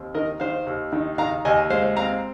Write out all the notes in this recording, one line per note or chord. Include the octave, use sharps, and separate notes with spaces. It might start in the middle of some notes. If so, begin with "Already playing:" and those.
Already playing: D#2 C4
D#3 A#4 D#5
D#3 C5 F5
D#2
D#3
D#3 F5 A#5
D#2 D#5 G#5
G#3 C5 F5
C4 F5 A#5